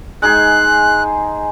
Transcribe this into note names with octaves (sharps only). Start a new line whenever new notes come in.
G#3 D#4 G#4 F#6